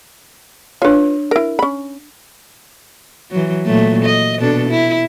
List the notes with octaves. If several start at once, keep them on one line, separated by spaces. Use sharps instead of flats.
D4 F4 B4 C#5
E4 A#4
C#4 B5
E3 F#3
A#2 F#3 A3
D#5
B2 D4 A4
E4